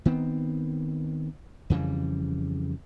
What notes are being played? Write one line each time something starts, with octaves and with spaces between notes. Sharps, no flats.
D#3 B3 C4
F2 C#3 E3 G3